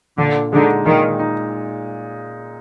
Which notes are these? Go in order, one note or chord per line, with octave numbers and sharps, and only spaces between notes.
A#2 D3
D3 G#3 D#4
A#2 D#3
D#4